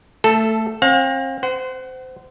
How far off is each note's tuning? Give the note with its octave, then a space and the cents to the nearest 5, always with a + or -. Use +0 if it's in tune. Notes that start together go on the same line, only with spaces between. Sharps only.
A3 +15 A4 -5
C4 +40 F5 +40
C5 -20 F#5 +25